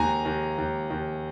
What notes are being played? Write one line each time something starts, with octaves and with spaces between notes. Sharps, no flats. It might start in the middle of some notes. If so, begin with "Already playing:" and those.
Already playing: D#2 G#5 A#5
D#2
D#2
D#2